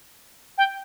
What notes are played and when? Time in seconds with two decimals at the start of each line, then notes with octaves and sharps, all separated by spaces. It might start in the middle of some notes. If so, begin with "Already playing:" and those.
0.58 G5